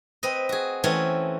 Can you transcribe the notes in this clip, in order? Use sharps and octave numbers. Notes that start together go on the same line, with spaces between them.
C4 B4 D#5
F#4 G#4
E3 A3 C4 C#4 C#5